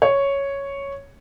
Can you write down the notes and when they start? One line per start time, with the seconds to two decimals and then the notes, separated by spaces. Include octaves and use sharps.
0.02 C#5